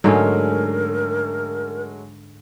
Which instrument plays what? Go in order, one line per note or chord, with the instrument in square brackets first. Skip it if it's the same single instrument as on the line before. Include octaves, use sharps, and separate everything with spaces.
[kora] G#2 D3 C#4 [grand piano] F#3 G#3 A3 [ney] A#4